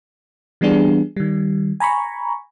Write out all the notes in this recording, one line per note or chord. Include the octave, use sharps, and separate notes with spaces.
E3 G3 B3 D4 G#4
D#3 G3
G#5 A#5 B5 C#6